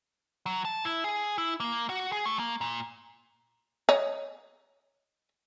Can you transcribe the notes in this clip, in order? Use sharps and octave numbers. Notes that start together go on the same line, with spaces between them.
F#3
A5
E4
G#4
E4
A#3
F#4
G#4
A3
A#3
A#2
C#5 D#5